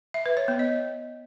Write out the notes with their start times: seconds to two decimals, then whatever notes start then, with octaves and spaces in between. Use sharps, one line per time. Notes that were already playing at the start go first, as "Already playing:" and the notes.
0.14 E5
0.26 B4
0.37 C#5
0.48 B3
0.59 D#5